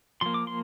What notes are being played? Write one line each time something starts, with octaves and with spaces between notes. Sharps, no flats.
F3 A#3 C6
D6
C6